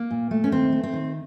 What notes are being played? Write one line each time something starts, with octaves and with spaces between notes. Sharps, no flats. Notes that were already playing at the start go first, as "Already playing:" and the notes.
Already playing: A#3
A#2
A3
C#4
D#2 C4
A3
C4
D#3